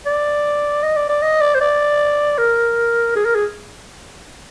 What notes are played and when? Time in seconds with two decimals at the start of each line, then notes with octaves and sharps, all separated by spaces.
0.06 D5
0.83 D#5
0.96 D5
1.09 D5
1.22 D#5
1.41 D5
1.55 C5
1.61 D5
2.38 A#4
3.15 G#4
3.25 A#4
3.35 G#4